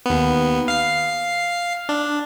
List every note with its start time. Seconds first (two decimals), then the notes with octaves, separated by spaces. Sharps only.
0.06 D#2 B3
0.68 F5 C7
1.89 D4